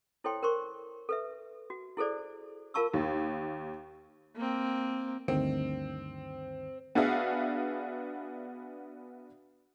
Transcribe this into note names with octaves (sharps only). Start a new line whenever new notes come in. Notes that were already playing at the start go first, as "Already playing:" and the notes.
E4 A4 C5 C#5 G5 C6
A#4 C5 C6 C#6
A4 B4 E5
F#4
E4 G#4 A4 C5 D5
F4 A#4 F5 A5 C#6 E6
D#2
A#3 C4
D2 G2 D#3 C4
B3 D4 F#4 G#4 E5 F5